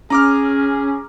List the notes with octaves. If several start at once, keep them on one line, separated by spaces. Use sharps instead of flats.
C#4 G#4 A#5 D6 F6